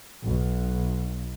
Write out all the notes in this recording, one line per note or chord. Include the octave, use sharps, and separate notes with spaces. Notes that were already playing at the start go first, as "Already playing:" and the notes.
B1